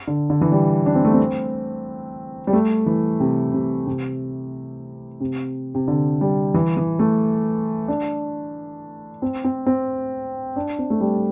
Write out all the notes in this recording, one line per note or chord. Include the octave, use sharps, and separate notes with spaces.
D3
D3
E3
G3
D4
C4
A3
C4
G3
A3
E3
C3
C3
C3
C3
C3
D3
G3
E3
E3
A3
D4
C4
C4
C4
D4
C4
A3
G3